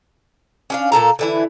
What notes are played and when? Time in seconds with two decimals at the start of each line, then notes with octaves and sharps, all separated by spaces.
0.70 C#4 D4 F5
0.92 A#2 C#3 A4 A#5
1.19 D3 E3 E4